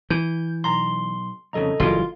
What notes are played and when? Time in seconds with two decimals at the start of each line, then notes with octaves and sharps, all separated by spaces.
0.10 E3 G6
0.64 B1 A#5 C6
1.53 C2 F2 C#3 A4 D#5 A#5
1.80 F#1 G2 E3 F4